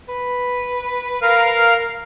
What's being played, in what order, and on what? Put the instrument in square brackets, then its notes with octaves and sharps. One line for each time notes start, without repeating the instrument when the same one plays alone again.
[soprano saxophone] B4
[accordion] A#4 F5 F6